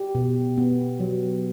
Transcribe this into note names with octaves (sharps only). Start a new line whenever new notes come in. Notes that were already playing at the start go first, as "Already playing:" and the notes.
Already playing: G4
B2
B3
F#3